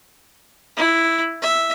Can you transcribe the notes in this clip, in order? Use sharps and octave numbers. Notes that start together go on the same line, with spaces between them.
E4
E5